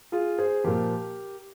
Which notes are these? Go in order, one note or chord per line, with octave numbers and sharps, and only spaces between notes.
F4 G#4
G#4 C5
A#2 F3 G4 A#4